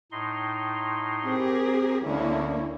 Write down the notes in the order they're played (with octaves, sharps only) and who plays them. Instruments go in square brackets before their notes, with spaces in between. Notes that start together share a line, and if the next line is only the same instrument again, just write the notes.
[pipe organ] A2 D#4 C6
[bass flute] C4 [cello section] G4 G#4 A#4
[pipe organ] D2 [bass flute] D3 [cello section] A#3 C#4 E4